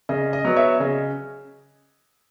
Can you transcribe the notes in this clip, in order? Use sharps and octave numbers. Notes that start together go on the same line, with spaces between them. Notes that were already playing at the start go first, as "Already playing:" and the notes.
C#3 D#5
D#5
F#3 B3
C#5 E5
C#3 D#5